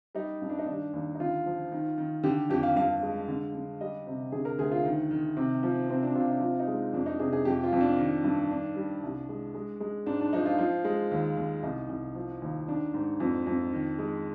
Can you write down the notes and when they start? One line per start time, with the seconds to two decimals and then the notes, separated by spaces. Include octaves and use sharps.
0.15 G3 D#4
0.42 G2
0.49 D4
0.59 D#4
0.66 D#3 D4
0.93 D#2
1.15 D#4
1.20 D3 F4
1.46 F3
1.72 D#3
1.98 D#3
2.24 D3 G4
2.50 F2 G4
2.63 F5
2.76 G2 F5
3.03 G#3
3.28 D3
3.55 D3
3.81 G3 D#5
4.07 C3
4.32 D3 G#4
4.45 A#4
4.58 D2 G#4
4.72 F4
4.85 D#3
5.11 D#3
5.37 C3
5.63 F3
5.89 C3 C4
6.03 D4
6.15 C3 F4
6.29 D#4
6.41 F3 F4
6.59 D#4
6.68 G#3
6.93 F2 D4
7.06 D#4
7.19 C3 G#4
7.33 G#4
7.45 F2 G4
7.64 F4
7.73 F2
7.81 D4
7.98 D#3
8.24 G2
8.50 D#3 D4
8.76 G3
9.03 C2
9.29 G#3
9.55 G#3
9.80 G#3
10.06 G#2 D4
10.20 D4
10.33 F3 D#4
10.45 F4
10.58 F3
10.85 G#3
11.12 D#2
11.37 D#2
11.63 C2 D#4
11.89 C2
12.15 F3
12.42 D#2
12.68 D#3 D4
12.94 G#2
13.20 F2
13.47 F2
13.73 D#3
13.99 G#3